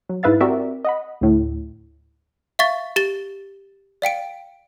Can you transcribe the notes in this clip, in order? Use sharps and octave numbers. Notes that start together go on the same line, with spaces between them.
F#3
G#2 E4 B4 E5 F5 A6
C4 F#4 G4 A#4 D5 E5
D#5 F#5 B5
D2 A2
E5 F5 C#6 A6
G4 A6 G7
D5 F5 G5 D7